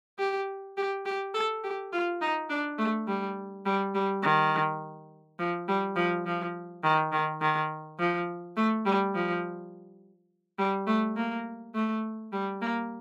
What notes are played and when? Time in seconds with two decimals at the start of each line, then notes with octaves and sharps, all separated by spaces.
0.19 G4
0.77 G4
1.06 G4
1.34 A4
1.64 G4
1.93 F4
2.21 D#4
2.50 D4
2.78 A3
3.08 G3
3.66 G3
3.94 G3
4.23 D#3
5.39 F3
5.68 G3
5.96 F3
6.26 F3
6.84 D#3
7.12 D#3
7.41 D#3
7.99 F3
8.57 A3
8.86 G3
9.15 F3
10.59 G3
10.87 A3
11.17 A#3
11.75 A3
12.33 G3
12.61 A#3